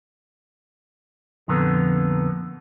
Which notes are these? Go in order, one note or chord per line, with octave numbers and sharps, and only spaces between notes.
F2 A#2 D3 A#3 B3